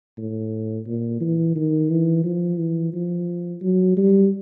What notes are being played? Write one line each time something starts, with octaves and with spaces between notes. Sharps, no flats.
A2
A#2
E3
D#3
E3
F3
E3
F3
F#3
G3